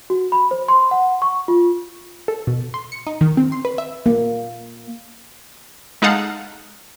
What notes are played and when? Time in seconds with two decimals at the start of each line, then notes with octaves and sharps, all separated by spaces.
0.10 F#4
0.32 B5
0.51 C5
0.68 C6
0.91 F#5
1.22 C#6
1.48 F4
2.28 A4
2.47 B2
2.74 C6
2.92 C#7
3.07 D#4
3.21 D#3
3.37 C4
3.52 C6
3.65 B4
3.78 E5
4.06 A#3
6.02 G#3 D#4 A4 F5 F#5